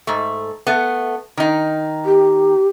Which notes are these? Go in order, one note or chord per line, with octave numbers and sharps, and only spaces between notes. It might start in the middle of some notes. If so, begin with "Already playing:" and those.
G#2 A3
A3 B3
D#3 D#4
G4